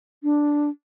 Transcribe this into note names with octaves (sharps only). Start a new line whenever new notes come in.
D4